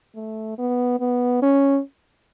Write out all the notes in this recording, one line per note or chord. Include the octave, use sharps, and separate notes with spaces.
A3
B3
B3
C#4